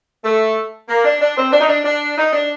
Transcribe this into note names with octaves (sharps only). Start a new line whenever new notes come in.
A3
A#3
D4
D4
C4
D4
D#4
D4
D4
D#4
D4